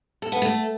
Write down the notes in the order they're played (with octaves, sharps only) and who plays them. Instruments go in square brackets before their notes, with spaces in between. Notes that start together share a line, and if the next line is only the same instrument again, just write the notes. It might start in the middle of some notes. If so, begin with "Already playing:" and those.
[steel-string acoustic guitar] A4
B3
A3